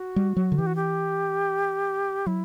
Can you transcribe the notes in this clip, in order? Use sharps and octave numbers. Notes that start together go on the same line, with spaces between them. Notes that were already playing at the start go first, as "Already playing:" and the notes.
Already playing: F#4
G3
F#3
D3
E3 G4
F#4
G4
F#3 E4